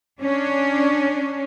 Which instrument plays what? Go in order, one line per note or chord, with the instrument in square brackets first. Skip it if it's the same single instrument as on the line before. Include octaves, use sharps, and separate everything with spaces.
[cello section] C#4 D4